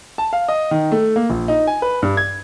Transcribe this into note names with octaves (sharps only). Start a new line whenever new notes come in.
A5
F5
D#5
D#3
A3
A#3
A#1
D#4
G#5
B4
G2
G#6